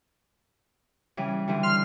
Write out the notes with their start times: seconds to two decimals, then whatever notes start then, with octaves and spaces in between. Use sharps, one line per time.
1.17 C#3 E3 G3
1.48 D3 E3 G3
1.63 C6 F6